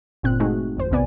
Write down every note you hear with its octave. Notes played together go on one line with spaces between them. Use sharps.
G1 A#2 C4 F#6
G#3 A3 C4 D#4 F#4 G#4
G#1 F2 C5
B1 E2 C3 B3 D5 G#5